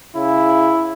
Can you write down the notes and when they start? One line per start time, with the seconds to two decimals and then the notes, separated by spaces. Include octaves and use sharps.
0.16 C#3 E4